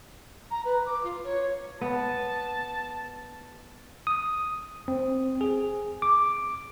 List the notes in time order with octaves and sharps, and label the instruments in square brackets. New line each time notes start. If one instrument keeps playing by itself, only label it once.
[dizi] A#5
B4
D6
F4
C#5
C#5
[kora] B3 [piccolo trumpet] A5
[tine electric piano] D#6
C4
G#4
D6